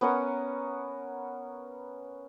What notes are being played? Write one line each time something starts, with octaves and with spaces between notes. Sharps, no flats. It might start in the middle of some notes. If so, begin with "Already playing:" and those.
B3 C#4 A#4 F#5